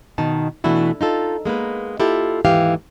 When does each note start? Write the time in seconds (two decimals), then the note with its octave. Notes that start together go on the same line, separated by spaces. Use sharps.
0.18 B2 D#3 D#4 A5
0.64 B2 E3 A3 D4 E4 F#4
1.01 D#4 F4 A4
1.45 G#3 A#3 B3 B4
2.00 E4 F4 G4 A4
2.45 D#2 G#2 E3 G4 F5